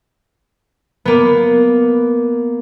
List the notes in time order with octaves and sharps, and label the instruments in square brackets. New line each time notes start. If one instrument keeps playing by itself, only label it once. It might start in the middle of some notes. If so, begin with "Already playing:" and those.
[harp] A#3 B3